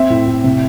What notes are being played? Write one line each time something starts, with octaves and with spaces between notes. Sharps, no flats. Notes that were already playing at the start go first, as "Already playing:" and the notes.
Already playing: C4 E5
A2
A2
C3